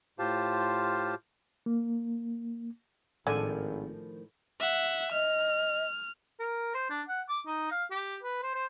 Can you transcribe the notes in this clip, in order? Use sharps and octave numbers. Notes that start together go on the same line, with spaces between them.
A2 F4 G4 C5 F5 A5
A#3
G#1 A2 D3 D#3 F3 A4 D5 G#5
E5 F#5
D#5 F6
A#4
C5
D4
F#5
D6
D#4
F5
G4
B4
C5
C5